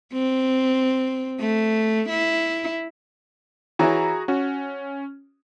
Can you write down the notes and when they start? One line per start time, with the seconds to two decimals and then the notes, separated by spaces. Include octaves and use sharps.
0.13 C4
1.39 A3
2.09 E4
3.79 E3 F#4 G#4 C#5 E5 A#5
4.28 C#4 F#4